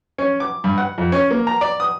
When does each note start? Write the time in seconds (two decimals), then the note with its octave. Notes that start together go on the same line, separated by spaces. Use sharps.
0.18 C#4
0.40 D6
0.64 G2
0.78 F#5
0.98 F2
1.12 C#4
1.31 A#3
1.47 A#5
1.61 D5
1.80 D#6